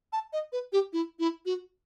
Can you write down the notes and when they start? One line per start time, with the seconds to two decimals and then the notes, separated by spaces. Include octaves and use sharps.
0.13 A5
0.33 D#5
0.52 B4
0.73 G4
0.93 E4
1.19 E4
1.46 F#4